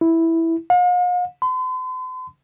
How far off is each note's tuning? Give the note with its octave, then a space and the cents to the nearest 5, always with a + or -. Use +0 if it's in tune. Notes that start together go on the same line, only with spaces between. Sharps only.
E4 -5
F5 +45
C6 -45